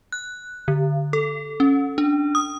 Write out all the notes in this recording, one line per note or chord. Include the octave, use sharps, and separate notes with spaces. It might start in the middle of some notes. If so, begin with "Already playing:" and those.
F#6
D3
A4
C#4
D4
D#6